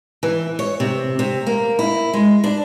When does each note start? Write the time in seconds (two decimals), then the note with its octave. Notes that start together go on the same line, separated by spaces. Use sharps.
0.23 E3
0.59 C#5
0.80 C3
1.19 C3
1.47 A#3
1.79 E4
2.13 G#3
2.44 D4